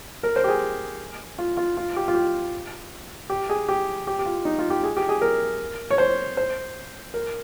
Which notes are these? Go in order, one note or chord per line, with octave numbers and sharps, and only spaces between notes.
A#4
C5
G4
G#4
F4
F4
F4
G4
F4
G4
G4
G#4
G4
G4
G4
F4
D#4
F4
G4
G#4
G4
G#4
A#4
C#5
C5
C5
A#4